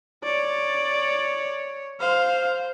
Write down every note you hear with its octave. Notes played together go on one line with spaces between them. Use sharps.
C#5 D5
C5 F5